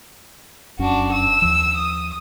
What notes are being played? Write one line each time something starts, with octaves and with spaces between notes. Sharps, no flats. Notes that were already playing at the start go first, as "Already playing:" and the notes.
F1 F#2 C#4 D4 F#4
E6
D#2 F3
D#6